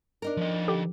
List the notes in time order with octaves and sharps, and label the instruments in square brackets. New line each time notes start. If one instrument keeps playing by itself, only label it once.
[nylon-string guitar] D4 D#4 A#4
[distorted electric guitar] F3 D#5
[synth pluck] D3 G4